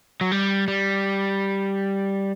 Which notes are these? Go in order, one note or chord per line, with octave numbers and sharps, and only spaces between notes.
F#3
G3
G3